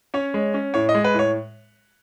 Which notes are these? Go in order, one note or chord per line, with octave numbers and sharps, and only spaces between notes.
C#4 C#5
G#3
C#4
A2 C#5
D#5
G#3
B4
A2 C#5